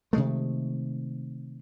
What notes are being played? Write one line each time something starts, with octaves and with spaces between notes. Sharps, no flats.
C3 D#3 G#3 A3